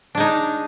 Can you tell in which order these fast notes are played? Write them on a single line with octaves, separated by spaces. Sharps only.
D4 G#3 D#4